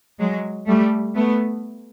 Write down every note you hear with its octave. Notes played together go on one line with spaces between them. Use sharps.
F#3 G#3
G3 A3
A3 B3